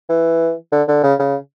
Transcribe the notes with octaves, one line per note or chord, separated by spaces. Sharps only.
E3
D3
D3
C#3
C#3